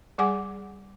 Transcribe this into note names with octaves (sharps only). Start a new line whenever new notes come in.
G3 G#4 F#5 G#5 D6